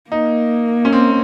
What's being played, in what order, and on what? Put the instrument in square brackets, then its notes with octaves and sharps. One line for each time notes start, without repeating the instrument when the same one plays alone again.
[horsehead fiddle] A#3 [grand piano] D#4
[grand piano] C#4
C4